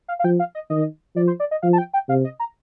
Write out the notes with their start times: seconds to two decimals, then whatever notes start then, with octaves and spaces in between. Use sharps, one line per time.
0.08 F5
0.19 F5
0.24 F3 G5
0.39 F5
0.55 D#5
0.70 D#3 D#5
1.16 F3 D5
1.27 C5
1.40 D5
1.51 D#5
1.62 F3 F5
1.73 A5
1.78 G5
1.93 G5
2.08 C3 F5
2.24 D#5
2.40 A#5